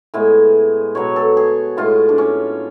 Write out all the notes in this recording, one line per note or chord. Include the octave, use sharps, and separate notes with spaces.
A2 G#3 B3 G#5
B2 F#3 B3 C#5
A4
G#4
A2 G#3 B3 F4
D4
C#4